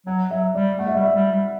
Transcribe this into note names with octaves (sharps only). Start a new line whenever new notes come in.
F#3 F#5
F#3 E5
G3 D5
A3 F#5
E5
G3 D5
E5
G3
G3